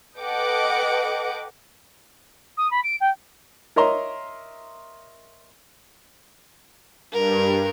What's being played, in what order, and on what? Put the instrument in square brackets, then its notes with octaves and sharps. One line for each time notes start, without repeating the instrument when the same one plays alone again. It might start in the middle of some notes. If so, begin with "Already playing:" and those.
[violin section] A4 B4 D#5 F#5 G5 D6
[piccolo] D#6
B5
D7
G5
[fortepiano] A#4 C#5 D#5 E5 A#5 C6
[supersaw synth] G2 [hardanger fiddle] A#4